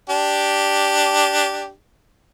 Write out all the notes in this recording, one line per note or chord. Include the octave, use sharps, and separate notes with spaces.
D4 G4